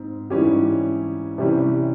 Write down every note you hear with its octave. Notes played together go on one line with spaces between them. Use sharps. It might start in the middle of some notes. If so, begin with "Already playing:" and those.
Already playing: G#2 C4
G#2 E3 G3 C#4 G4
C3 E3 G3 C#4